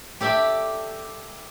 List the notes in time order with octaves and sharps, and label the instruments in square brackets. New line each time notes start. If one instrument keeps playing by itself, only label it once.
[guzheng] G4 A4 D5 E5 G5